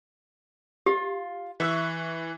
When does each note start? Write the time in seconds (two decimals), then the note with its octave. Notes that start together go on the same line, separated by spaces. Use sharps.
0.86 F4 G4
1.60 E3 E5 C#6 E6 F#6